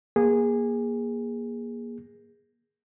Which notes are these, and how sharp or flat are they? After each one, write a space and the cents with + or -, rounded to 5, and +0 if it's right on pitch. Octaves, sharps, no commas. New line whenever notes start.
A#3 +25 G#4 -15